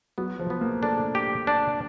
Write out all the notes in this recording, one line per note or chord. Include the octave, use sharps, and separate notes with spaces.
F#3 B3
F3
B3
A#3
A3 D4
G4
D4